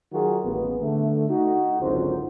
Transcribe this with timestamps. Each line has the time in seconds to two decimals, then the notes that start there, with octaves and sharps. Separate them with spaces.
0.13 D#3 F#3 F4 F#4 G#4 A#4
0.44 A1 D#2 B3
0.81 D3 A3
1.29 D#4 F#4
1.80 G#1 C#2 F#2 D3 F4 C5